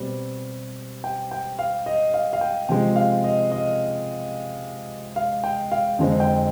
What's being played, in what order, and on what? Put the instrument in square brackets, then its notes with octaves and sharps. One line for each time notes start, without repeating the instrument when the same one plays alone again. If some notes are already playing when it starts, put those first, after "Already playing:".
Already playing: [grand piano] B2 G3 C4
G5
G5
F5
D#5
F5
F5
G5
C3 F3 G#3 G5
F5
D#5
D#5
F5
G5
F5
F2 D3 G#3 C4
G5